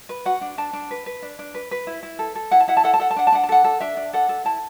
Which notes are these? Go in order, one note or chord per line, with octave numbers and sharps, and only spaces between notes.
B4
F#4 F#5
D4
D4 A5
D4
B4
B4
D4
D4
B4
B4
E4
E4
A4
A4
E4 F#5
A5
E4 F#5
A5
A4 F#5
A5
A4 F#5
A5
D4 F#5
A5
D4 F#5
A5
A4 F#5
A4
D4 E5
D4
A4 F#5
A4
E4 A5